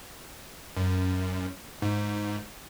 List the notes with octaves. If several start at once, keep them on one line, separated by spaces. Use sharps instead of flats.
F#2
G#2